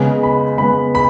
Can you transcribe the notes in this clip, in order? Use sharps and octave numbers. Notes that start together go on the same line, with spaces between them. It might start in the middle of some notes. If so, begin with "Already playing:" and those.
Already playing: C#3 G#3 B3
B5
C#3 G#3 B3 B5
B5